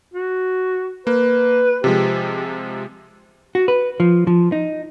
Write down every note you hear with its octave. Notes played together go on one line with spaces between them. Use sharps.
F#4
A#3 B4
C3 F3 G#3 G4
F#4
B4
F3
F3
D#4